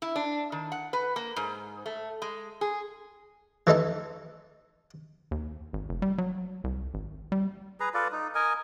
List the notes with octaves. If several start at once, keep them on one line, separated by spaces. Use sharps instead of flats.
E4
D4
D#3
F#5
B4
A#3
G#2
A3
G#3
G#4
E3 A3 D#4 A4
D#2
G#1
F1
G3
F#3
C2
G#1
G3
G#4 B4 A#5
F4 A4 B4 D5
D#4
A#4 D#5 G#5